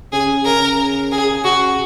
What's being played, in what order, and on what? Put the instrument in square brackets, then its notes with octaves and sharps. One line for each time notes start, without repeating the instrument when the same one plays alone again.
[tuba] C#3 [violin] G#4
[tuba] C#3 [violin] A#4
[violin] G#4
[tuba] C#3 [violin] F#4